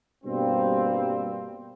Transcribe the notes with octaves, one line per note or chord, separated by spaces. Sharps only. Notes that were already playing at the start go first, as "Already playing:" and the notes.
G2 B2 G3 A#3 C4